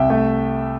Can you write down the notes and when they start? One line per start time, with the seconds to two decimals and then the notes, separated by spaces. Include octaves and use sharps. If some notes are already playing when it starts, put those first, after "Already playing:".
Already playing: C2 E5 G5
0.10 A3